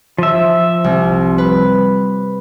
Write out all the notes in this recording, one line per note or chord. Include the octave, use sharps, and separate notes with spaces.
F3 E5
C2
B4